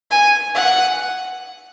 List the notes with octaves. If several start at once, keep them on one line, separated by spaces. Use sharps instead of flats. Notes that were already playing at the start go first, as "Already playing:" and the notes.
G#5
F#5